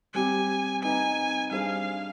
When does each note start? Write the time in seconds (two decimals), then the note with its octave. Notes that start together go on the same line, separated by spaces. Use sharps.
0.14 G3 C4 G4 G#5
0.82 C4 D#4 B4 G#5
1.51 G3 D4 G#4 C5 F5